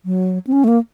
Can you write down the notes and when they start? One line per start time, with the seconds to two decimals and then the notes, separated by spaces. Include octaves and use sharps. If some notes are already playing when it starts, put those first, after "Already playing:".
0.05 F#3
0.47 C4
0.52 C#4
0.64 A3
0.68 A#3